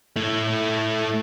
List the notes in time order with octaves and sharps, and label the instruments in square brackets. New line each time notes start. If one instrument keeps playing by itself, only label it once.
[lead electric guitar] A3 E4